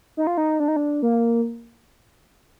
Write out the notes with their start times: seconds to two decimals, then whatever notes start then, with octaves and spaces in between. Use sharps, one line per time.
0.17 D#4
0.27 F4
0.37 D#4
0.60 D4
0.68 D#4
0.76 D4
1.03 A#3